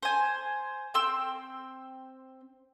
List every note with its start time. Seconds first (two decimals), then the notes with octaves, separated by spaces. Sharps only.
0.03 C5 G#5
0.94 C4 G5 C6 E6